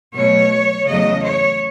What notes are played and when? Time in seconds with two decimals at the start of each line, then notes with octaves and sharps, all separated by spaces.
0.15 B2 F#3 A3 C#5
0.88 E2 C#3 F#3 A3 D#5
1.24 C#5